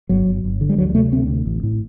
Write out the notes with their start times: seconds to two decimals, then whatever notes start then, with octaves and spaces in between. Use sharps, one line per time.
0.09 G1 F#3
0.26 G1
0.44 G1
0.61 D3
0.69 G3
0.78 D2 F#3
0.90 G3
0.95 C3 A3
1.12 D2 C4
1.29 C3
1.45 A1
1.63 A2